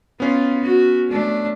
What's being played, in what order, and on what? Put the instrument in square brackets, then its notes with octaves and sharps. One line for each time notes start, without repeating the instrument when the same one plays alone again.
[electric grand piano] B3 C#4 [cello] F4
[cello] F#4
A3 D4